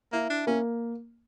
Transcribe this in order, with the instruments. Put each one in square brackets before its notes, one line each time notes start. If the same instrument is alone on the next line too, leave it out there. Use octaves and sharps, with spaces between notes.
[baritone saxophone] A#3 [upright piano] E4
[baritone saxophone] D4
[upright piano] A#3 [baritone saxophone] C#4